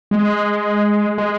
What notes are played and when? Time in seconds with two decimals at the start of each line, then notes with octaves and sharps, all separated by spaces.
0.11 G#3
1.18 G#3